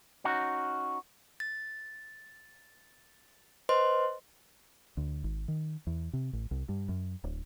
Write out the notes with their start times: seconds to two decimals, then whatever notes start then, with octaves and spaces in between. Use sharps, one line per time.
0.24 C#4 D#4 F#4
1.40 A6
3.69 B4 C5 D#5 C6
4.97 D2
5.24 G#1
5.48 D#3
5.87 E2
6.13 C3
6.33 A1
6.51 C2
6.69 G2
6.89 F#2
7.24 D1